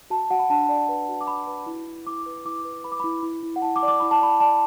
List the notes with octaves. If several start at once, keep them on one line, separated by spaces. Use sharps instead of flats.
F#4 A5
F#4 F#5
B5
D4 A5
D5
B4
F#4
D6
F#4 B5
B4
E4
E4
E4 D6
B4
E4 D6
B4
B4 B5
D6
E4 B5
E4
E4
F#5
E4 A5
D6
D5
D6
E4 B5
A5
D5 B5
D5 A5